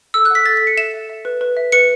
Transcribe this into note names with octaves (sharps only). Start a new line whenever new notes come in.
A4 E6
F#6
F#5 B6
A4 A6
B6
A4
C#7
E5 E7
E5
E5
B4
B4
E5
B4 C#7